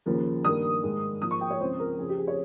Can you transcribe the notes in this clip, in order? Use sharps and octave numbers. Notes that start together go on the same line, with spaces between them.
D#2 C#3 F3 A#3
G2 D#3 A#3 D#6
G#2 D#3 G#3
G#2 F3 A#3 D#6
C#6
G5
C#5
C#2 C#3 F3 C4 C5
A#4
F2 C#3 F3 C4 G#4
G4
G#4
C#5